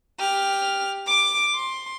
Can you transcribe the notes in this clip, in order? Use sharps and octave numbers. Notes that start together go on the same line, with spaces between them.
G4 F6
D6 D7
C6